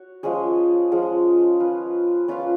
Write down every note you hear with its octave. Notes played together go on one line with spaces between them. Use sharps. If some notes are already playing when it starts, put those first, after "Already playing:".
Already playing: F#4 C#5
F3 G#3 C#4 G#4
F3 G#3 C#4 G#4
C#4 F4 B4 F5
C#4 F4 B4 F5